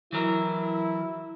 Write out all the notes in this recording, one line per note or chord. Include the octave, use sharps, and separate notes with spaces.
E3 F#3 E4 A#4